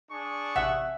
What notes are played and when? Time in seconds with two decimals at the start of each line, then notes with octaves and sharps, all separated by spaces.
0.11 D4 G#4 C#6
0.56 A1 C3 E5 F#5